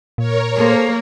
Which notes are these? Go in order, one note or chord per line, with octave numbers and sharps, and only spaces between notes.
A#2 A#4 C#5
A#3 G#4 A4 C5